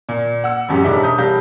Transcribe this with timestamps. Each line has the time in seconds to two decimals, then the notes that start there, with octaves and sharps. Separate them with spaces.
0.09 A#2
0.44 F#5 E6
0.69 A1 F#2 G4
0.84 E1 G#2 D4 G4 E5 B6
1.03 A#5 D#6 G6
1.18 E1 G3 F5 G6 A#6